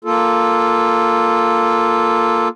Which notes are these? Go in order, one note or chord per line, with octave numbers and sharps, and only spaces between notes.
A#3 F4 A4